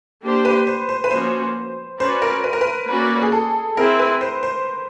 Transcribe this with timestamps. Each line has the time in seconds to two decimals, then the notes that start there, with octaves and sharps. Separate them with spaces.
0.23 A#3 D4 G4 C5
0.45 B4
0.67 C5
0.89 C5
1.04 B4
1.11 F3 A#3 C#4 F#4 C5
1.99 C#4 F#4 B4 C5 D5
2.22 A#4
2.44 B4
2.53 A#4
2.61 B4
2.88 A#3 C#4 F#4 B4 D5
3.22 G#4
3.32 A4
3.76 C4 E4 G#4 A#4
3.99 B4
4.21 C5
4.43 C5